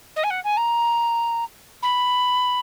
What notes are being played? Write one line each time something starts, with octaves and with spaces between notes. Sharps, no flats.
D#5
G#5
F#5
G#5
A#5
B5